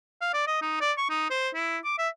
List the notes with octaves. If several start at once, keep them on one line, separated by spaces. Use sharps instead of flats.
F5
D5
D#5
D#4
D5
C#6
D#4
C5
E4
D6
E5